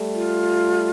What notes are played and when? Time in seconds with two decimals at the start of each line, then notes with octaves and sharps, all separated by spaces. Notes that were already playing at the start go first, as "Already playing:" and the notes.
Already playing: G3 A3
0.14 F4